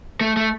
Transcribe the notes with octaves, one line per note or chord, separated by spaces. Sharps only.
A3
A3